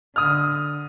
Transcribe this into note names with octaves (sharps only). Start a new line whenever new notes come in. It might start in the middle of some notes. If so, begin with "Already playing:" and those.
D3 D#6 F6